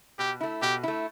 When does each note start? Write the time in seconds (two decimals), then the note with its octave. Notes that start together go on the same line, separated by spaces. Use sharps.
0.19 B2 G4
0.41 A3 E4
0.62 B2 G4
0.83 A3 E4